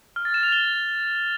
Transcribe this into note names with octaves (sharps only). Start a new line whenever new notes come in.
F6
A6
E7
F7
G7